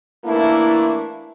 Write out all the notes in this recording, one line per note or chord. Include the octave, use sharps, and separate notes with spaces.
E3 A3 A#3 D4 E4